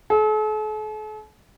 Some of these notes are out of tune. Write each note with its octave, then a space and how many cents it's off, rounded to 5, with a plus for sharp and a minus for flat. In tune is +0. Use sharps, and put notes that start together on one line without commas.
A4 -45